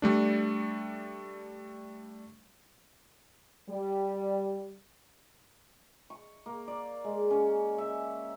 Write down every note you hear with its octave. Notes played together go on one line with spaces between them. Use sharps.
G3 A3 D4
G3
C#6
A#3
D5
G#3
C#4
E5